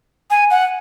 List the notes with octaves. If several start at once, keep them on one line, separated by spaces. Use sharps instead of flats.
G#5
F#5